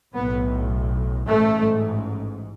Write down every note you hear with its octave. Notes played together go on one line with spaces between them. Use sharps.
B1 A2 B3
A1 G#2 A3